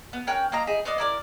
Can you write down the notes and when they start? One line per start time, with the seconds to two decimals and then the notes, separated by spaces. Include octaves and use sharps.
0.13 B3
0.27 C#4 A#4 G5 F#6
0.52 A#3 F4 D#5 A#5
0.67 D#4 E4 G#4
0.85 B3 C5 D5 D#5
0.98 E4 A#4 D5